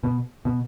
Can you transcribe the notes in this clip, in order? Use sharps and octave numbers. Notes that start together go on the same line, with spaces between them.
B2
B2